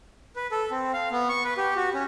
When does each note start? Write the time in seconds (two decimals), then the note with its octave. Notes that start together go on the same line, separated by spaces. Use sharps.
0.36 B4
0.52 A4
0.71 C4
0.93 F5
1.12 B3
1.29 C#6
1.44 B4
1.57 G4
1.76 F#4
1.94 C#4